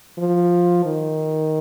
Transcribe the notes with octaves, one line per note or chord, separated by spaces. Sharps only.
F3
D#3